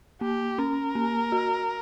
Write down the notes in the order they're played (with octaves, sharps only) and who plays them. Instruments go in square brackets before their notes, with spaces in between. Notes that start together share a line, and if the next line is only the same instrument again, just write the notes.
[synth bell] A#3 [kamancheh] G4
[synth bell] C#4 [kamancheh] A#4
[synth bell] A#3
F#4